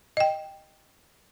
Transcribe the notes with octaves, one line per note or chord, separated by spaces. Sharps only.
D#5 G5